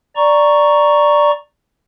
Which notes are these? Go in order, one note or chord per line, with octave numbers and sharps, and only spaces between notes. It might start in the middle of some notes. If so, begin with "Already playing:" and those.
D5 A#5 C#6